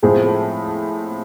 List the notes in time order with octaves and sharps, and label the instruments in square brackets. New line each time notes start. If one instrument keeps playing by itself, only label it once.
[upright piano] A2 F3 G#3 C4 G#4